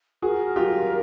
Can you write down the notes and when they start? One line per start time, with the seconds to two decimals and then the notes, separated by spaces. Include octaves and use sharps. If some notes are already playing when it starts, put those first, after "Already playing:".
0.22 F#4 G#4 A#4
0.56 F4 G4